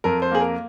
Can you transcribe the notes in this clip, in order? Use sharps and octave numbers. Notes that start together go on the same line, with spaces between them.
F2 A#4
C5
A#3 G#4
A#4